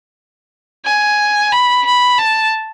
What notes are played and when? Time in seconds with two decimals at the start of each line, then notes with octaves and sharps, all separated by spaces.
0.86 G#5
1.52 B5
1.86 B5
2.18 A5